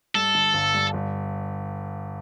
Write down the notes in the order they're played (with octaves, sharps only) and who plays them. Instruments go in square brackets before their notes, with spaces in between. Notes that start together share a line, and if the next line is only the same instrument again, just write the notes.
[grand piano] G2 [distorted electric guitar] A4
[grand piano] D3
G1
G2
G1